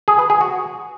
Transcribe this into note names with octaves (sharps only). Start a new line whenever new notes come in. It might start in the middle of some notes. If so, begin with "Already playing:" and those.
G#4
B4
G#4
F#4